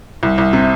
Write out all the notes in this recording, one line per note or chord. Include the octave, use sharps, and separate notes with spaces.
C2
C2
C3